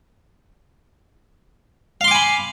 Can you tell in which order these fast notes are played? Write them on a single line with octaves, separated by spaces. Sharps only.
F5 C6 D6 G#5 B5